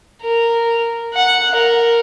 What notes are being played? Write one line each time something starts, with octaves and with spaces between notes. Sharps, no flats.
A#4
F#5
A#4